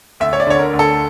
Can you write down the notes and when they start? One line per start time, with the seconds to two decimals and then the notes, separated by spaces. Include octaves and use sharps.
0.20 D2 E5
0.33 C#5
0.40 D5
0.47 D3 C#5
0.59 A#4
0.73 D2
0.79 A4